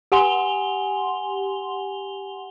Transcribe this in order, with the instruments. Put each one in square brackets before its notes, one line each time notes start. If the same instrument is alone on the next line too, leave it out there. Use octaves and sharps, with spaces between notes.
[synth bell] G4 F#5 G#5 C6 F7 G7